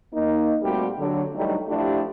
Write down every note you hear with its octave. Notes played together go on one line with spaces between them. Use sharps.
A#3 D#4
A#2 G3 A3 C4 F#4 G4
D3 F#3
E3 F#3 G3 A3 D4 D#4
F3 A3 D4 E4 G4